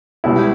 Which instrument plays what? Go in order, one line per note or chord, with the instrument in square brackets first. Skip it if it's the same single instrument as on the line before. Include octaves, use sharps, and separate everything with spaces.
[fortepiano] C#2 B2 G3 E4